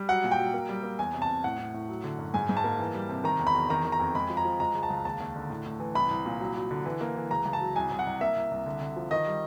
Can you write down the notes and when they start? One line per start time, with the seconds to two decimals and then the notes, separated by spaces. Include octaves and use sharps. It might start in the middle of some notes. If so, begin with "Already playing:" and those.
Already playing: G3
0.08 F#3 F#5
0.24 A#2
0.31 G5
0.38 F#3
0.54 A#3
0.69 G3
0.83 A#3
0.99 E2 G#5
1.14 C3
1.22 A5
1.29 C3
1.44 A2 F#5
1.59 A2
1.74 A2
1.89 F#3
2.04 D3
2.19 F#2
2.34 G#2 G#5
2.49 G#2
2.57 A5
2.64 A#3
2.79 E3
2.94 G3
3.09 C3
3.24 D#3 A#5
3.39 E2
3.47 B5
3.55 E2
3.70 D#3 A#5
3.85 D#3
3.92 A#5
4.00 F2
4.15 G#3 B5
4.30 F3
4.37 A#5
4.45 F3
4.60 G#3 A#5
4.74 C#2
4.83 A5
4.90 C#2
5.05 D#2 A5
5.20 D#2
5.36 D3
5.50 A2
5.66 A2
5.80 E3
5.95 C2 B5
6.11 C2
6.26 A#2
6.40 F#3
6.56 F#3
6.71 D3
6.85 E3
7.01 A#3
7.16 E3
7.30 C#2 A#5
7.45 C#2
7.53 A5
7.61 F#3
7.76 C2 G#5
7.91 C2
7.99 F#5
8.06 C2
8.21 A#3 E5
8.36 C2
8.51 C2
8.66 D3
8.81 D3
8.96 F3
9.11 D#3 D#5
9.27 G3